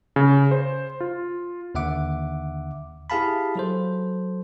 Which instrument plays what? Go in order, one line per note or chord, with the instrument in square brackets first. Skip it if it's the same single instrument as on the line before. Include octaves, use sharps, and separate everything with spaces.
[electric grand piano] C#3
C5
F4
[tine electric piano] D#2 D3 E5 F#5 D6
E4 G4 G#4 F5 A5 B5
F#3 A4 C5